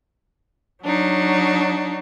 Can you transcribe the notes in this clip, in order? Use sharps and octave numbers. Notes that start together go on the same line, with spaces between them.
F#3 D4 D#4